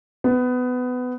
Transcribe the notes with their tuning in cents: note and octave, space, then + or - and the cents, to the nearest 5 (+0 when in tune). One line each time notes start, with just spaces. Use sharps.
B3 +20